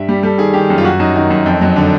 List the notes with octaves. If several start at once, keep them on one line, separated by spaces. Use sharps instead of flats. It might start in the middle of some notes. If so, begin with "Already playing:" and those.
Already playing: G2 E5
G3
G3 A4
D#3 G#4
D#3 G4
F#2
F4
F#2 F#4
F#2 D#4
D#3 D#4
F#2
F2
F#3
D3